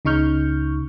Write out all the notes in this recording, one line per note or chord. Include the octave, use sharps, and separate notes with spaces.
C#2 C#3 D#4 C#6 F6 G6